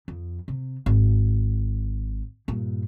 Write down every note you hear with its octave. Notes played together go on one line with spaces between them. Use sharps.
F2
C3
G#1
G2 A#2